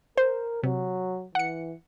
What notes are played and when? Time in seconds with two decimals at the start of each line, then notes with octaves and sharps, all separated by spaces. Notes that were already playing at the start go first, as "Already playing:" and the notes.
0.18 A#4 C5
0.63 C3 F#3
1.35 E3 F#5 C#7